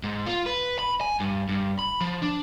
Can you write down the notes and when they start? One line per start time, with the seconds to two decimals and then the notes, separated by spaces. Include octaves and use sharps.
0.03 G#2
0.26 F4
0.46 B4
0.79 B5
1.01 G#5
1.20 G2
1.49 G2
1.79 B5
2.01 F3
2.22 D4